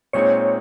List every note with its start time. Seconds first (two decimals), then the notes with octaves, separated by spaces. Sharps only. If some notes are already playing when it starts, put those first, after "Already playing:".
0.13 A#2 G#3 C4 D#4 C#5